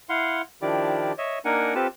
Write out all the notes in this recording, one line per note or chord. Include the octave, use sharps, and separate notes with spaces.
E4 F5 F#5 C6
D#3 F3 D4 E4 G4 D5
C#5 D#5 E5
A#3 D4 D#4 A#4 F#5 G#5
C4 F4 G4 A4 B4 A5